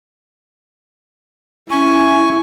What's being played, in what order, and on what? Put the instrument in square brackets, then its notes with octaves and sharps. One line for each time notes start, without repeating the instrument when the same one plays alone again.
[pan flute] C#4 [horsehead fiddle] E4 [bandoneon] G#5 C#6